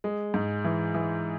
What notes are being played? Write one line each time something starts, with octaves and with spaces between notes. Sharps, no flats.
G#3
G#2
E3
E3